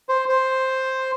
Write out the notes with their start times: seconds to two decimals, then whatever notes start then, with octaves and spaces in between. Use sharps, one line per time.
0.09 C5
0.29 C5